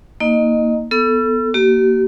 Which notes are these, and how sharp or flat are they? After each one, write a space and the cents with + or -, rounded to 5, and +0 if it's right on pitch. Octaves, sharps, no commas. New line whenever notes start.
A#3 +0 D#4 +25 D#5 -15
B3 +0 A4 +0 E6 +40
A#3 +0 G4 -40